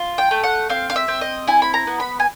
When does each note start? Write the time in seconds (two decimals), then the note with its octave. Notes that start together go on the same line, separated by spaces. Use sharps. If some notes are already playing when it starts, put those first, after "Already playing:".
Already playing: F4
0.18 G5
0.31 A3
0.43 F#5
0.69 C4 F5
0.90 F5
0.96 E5
1.08 C4
1.21 D#5
1.47 E4 G#5
1.62 B5
1.74 A#5
1.87 B3
2.00 B5
2.20 G#5